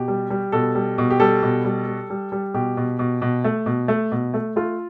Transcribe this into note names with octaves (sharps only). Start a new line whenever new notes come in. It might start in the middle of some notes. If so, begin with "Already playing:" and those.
Already playing: B2 G4
G3
G3
B2 A4
G3
B2
G4
G3 A4
B2
G3
G3
G3
G3
B2 G4
B2
B2
B2
A3
B2
A3
B2
A3
A3 F4